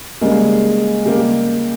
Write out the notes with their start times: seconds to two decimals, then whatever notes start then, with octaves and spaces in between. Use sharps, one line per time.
0.21 C#3 G3 G#3 A#3 G#4
1.05 C#3 G3 A#3 G4